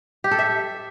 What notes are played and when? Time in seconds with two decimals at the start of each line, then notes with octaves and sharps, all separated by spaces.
0.24 G4
0.31 A4
0.39 E5